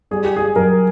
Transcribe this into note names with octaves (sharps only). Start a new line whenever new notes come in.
G3 G#4
G4
G#4
F#2 A#4